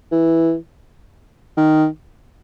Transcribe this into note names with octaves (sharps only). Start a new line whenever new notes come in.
E3
D#3